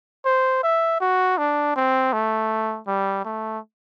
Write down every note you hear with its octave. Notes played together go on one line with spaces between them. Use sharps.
C5
E5
F#4
D4
C4
A3
G3
A3